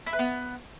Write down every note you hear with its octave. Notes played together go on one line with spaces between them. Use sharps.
E4
B4
B3